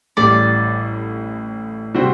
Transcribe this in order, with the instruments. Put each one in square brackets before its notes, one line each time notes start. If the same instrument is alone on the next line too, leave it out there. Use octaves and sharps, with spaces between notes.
[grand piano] A1 A2 G3 [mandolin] D5
[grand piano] C3 G3 C4 F#4 C5